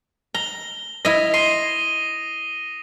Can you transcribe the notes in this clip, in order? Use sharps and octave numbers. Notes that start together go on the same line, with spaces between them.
A#5 G7
E4 D#5 D#6 A#6
C6 C7 D#7 G7